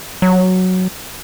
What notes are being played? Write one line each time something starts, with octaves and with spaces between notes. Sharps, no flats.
F#3